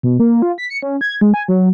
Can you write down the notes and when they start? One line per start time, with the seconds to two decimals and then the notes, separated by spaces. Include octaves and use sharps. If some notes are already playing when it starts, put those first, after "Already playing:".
0.03 B2
0.20 A#3
0.42 F4
0.58 B6
0.70 C#7
0.83 C#4
1.01 G#6
1.21 G#3
1.34 G#5
1.48 F#3